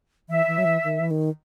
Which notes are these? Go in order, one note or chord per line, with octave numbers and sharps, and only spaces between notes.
E3 E5
E3
F#3
E3
D#3
E3
D#3